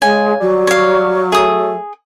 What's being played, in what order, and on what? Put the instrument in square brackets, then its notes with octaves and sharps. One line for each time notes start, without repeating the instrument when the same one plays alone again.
[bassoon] C#3 [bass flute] G#3 [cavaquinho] G#5
[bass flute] F#3 [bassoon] G3
[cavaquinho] C#5 F5
[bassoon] A3 [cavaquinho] G#4 D#6